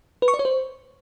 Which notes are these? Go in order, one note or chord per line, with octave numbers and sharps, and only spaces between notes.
B4
C#6
D5
C#5
C5